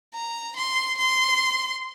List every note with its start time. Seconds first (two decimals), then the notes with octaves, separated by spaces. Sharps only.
0.14 A#5
0.56 C6
0.97 C6